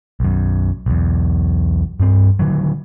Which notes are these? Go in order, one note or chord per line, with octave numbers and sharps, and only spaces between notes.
B1 F#2
B1 E2
G2 C4
D3 D#3 F#3